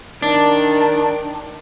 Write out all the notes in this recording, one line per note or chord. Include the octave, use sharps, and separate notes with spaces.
D#3 D4